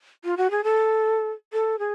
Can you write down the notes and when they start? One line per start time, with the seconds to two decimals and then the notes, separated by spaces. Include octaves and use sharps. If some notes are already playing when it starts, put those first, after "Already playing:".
0.25 F4
0.37 F#4
0.51 G#4
0.64 A4
1.53 A4
1.79 G#4